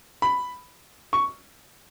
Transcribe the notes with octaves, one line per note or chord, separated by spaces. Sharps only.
B5
C#6